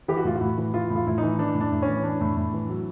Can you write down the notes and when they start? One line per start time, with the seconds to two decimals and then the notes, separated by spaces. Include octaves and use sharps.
0.08 E3 G4
0.17 F#4
0.24 A2 F4
0.35 F#4
0.41 A2
0.58 E3
0.73 E3 F4
0.90 A2
0.96 F4
1.06 A2 E4
1.18 E3 D#4
1.39 E3 D4
1.55 A2
1.60 D4
1.72 A2
1.82 C#4
1.88 E3
2.04 E3 D4
2.21 A2
2.37 A2
2.54 E3
2.70 F#3